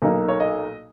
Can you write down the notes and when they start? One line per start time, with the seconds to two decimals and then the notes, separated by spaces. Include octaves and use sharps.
0.02 B1 A#2 A#3 D#4
0.28 C#5
0.40 D#5